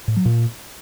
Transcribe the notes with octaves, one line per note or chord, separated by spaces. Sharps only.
A2
F#3
A#2